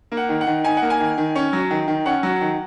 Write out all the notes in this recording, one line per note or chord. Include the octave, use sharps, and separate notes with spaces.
A#3
F#5
D#3
F#5
D#3
D#4 G#5
F#5
A#3
G#5
D#3
D#3
C#4
F#3
D#3
D#3
C#4 F#5
F#3
D#3